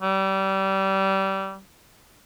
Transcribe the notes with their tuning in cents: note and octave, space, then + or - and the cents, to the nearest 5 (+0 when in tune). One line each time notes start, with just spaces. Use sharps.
G3 -25